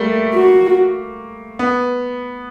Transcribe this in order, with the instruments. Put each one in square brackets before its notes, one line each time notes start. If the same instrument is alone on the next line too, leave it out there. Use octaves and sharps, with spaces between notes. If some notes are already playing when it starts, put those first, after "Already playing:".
Already playing: [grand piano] G3 A3 A#3
[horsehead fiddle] F#4
[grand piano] B3